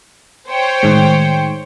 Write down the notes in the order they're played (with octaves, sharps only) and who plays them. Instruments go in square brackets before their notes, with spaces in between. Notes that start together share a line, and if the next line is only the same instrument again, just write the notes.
[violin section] C5 C#5 G5
[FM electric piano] A2 D#3 G#3